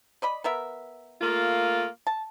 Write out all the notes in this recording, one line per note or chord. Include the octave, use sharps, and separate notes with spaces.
D5 D#5 B5
B3 A#4 E5
A3 A#3 F4
A5